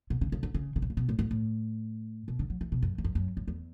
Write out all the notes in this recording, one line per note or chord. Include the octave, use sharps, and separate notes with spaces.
B2
C#3
C#3
D3
C#3
C#3
B2
C#3
B2
A2
G#2
A2
B2
D3
F#3
E3
B2
F#2
E2
F#2
F#2
F#2
E2